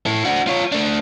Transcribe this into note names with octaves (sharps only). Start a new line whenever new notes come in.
E4 A4
D4 F#4
F4 C#5
A3 D4